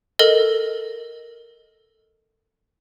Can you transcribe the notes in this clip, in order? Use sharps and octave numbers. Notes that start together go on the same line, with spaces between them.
A4 A#4 D#5